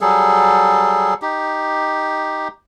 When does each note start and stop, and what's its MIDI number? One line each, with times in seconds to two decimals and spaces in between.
0.01 1.14 54
0.01 1.14 55
0.01 1.14 68
0.01 1.14 69
1.22 2.48 63
1.22 2.48 67